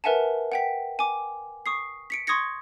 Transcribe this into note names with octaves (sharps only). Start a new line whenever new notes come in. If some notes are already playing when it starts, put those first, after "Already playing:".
A#4 B4 E5 F#5 G#5 A5
F#5 G5 B6
G#5 D6
C#6 D#6 C7
B6 C#7 D7
C6 C#6 D#6 G#6 A#6 C#7